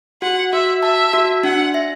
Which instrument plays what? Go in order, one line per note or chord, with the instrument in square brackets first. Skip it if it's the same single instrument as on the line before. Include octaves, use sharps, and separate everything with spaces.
[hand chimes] F#4 [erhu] F#5
[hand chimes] F#4 [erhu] E5
[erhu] E5 [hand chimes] A5
[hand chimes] F#4
[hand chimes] D4 [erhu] F#5
[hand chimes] E5